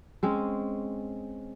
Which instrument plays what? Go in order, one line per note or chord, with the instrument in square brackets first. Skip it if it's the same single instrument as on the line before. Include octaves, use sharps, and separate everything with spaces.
[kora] G#3 C4 C#4